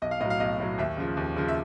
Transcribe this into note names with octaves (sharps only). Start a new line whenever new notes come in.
B1 D#5
F5
A2 F#3 D#5
F5
B1 D#5
A2 F#3
D#2 E5
C#3 F3
D#2
C#3 F3
E5